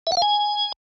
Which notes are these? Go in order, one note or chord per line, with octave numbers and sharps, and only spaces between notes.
E5
F#5
F5
G#5